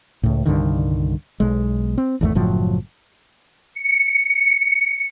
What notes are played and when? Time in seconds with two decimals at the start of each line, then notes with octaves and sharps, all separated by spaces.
0.23 C#2 A2
0.46 C2 G2 D3 D#3
1.40 B1 G#3
1.98 C4
2.21 G#1 E2 C3 A3
2.35 F#1 A2 F3 F#3
3.74 C#7